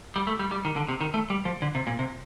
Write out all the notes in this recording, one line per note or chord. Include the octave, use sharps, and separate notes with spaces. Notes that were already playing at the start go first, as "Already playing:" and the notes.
G3
A3
G3
G3
D#3
D3
C3
D#3
A3
G3
F3
D3
C3
A#2
C3